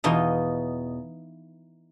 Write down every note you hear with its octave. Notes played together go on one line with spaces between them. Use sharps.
E2 B2 D#4 F4